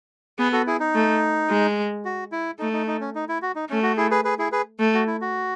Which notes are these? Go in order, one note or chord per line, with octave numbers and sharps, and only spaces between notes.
B3 G#4 B4
F#4 A4
E4 G#4
D#4
A3
G#3
F#4
E4
A3 D#4
D#4
D#4
C#4
D#4
E4
F#4
D#4
A3 C#4
F#4
E4 G#4
G#4 B4
G#4 B4
E4 G#4
G#4 B4
A3
F#4
E4
F#4